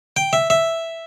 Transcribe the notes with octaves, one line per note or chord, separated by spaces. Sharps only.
G5
E5
E5